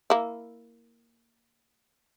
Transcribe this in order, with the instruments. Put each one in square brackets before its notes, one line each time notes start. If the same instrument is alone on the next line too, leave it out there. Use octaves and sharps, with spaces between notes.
[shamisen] A#3 E4